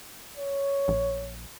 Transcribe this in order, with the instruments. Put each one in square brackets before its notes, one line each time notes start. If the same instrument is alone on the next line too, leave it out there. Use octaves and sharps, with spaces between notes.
[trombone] C#5
[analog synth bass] A#1